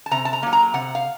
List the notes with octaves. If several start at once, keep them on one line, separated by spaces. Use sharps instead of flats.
A5
C3 A#5
A5
A#5
F#3 A#3
A#5
C3 F#5
F5